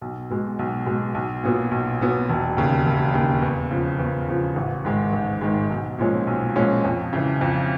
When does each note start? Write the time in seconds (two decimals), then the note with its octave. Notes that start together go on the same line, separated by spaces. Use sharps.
0.01 B1
0.30 B2 G#3
0.59 B1
0.86 B2 G#3
1.15 B1
1.43 A#2 F#3 B3
1.71 B1
2.00 A#2 F#3 B3
2.29 E1
2.57 D#2 C#3
2.86 E1
3.14 D#2 C#3
3.42 E2
3.71 C#3 F3
3.99 E2
4.28 C#3 F3
4.56 A1
4.85 G#2 D#3 G#3
5.13 A1
5.41 G#2 D#3 G#3
5.70 B1
5.98 A#2 F3 G#3 C#4
6.27 B1
6.56 A#2 F3 G#3 C#4
6.84 F2
7.13 C#3 E3
7.41 F2